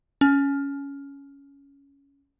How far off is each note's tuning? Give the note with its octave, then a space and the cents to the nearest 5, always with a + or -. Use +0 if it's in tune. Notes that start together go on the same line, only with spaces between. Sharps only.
C#4 +10